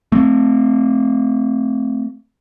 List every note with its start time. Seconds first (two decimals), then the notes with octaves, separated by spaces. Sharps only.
0.12 A3 C4